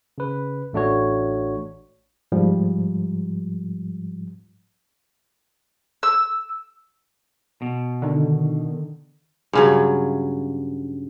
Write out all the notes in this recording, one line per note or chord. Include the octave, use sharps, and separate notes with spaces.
C#3 B4
A1 A3 D4 F#4 C#5
G#2 F3 G3
E6
B2
D3 D#3
G2 C#3 F#3